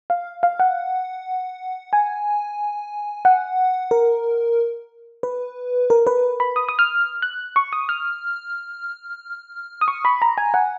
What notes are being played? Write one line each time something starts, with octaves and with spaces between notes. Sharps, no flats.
F5
F5
F#5
G#5
F#5
A#4
B4
A#4
B4
B5
D#6
D#6
F6
F#6
C#6
D#6
F6
D#6
C#6
B5
A#5
G#5
F#5